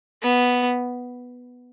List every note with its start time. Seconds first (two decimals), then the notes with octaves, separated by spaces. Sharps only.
0.22 B3